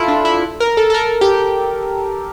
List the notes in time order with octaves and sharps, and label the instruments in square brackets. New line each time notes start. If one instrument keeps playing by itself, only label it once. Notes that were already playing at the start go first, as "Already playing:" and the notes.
Already playing: [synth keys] E4 F4 A4
D4
E4
A#4
A4
A4
A#4
G4